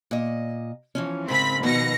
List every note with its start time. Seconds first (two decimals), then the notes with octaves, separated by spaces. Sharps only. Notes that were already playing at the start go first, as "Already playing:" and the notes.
0.11 A#2 D#5
0.95 E3 F3 C#4
1.28 G#2 C#3 C4 A#4 B5 B6
1.63 B2 D#3 F3 B3 A#6 C#7